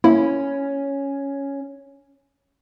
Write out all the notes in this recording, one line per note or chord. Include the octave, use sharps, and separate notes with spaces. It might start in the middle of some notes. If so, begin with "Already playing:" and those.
A#3 C#4 E4